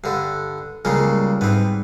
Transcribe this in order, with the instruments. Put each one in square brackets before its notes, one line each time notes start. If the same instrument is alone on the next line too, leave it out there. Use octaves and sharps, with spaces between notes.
[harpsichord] G2 D3
[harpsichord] C#2 C#3 A#3 [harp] G3
[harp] G#2 [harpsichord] B3 C4